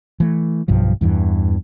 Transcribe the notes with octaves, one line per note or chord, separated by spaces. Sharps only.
E3 A3
B1 G2 F3
E2 G2 E3